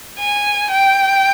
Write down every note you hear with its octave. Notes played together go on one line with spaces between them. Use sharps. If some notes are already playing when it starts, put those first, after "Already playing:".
G#5
G5